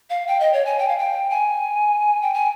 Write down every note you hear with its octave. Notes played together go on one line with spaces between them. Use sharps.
F5
G5
D#5
C#5
G#5
G5
F5
G5
G#5
G5
G#5